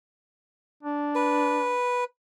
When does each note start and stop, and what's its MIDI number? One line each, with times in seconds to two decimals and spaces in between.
0.83 1.75 62
1.15 2.04 71